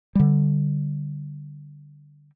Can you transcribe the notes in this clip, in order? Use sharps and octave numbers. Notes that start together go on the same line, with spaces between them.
D3 G3